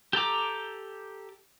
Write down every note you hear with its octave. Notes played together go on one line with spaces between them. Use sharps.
G4 A4 A#5 D6